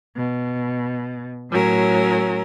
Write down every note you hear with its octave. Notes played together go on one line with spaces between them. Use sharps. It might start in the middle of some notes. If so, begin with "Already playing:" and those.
B2
A2 F#3 C#4 A#4